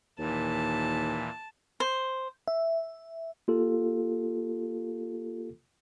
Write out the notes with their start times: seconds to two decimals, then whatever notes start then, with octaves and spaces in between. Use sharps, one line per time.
0.19 D#2 A#2 E3 A5
1.80 C5
2.48 E5
3.48 A#3 F4 G4 A4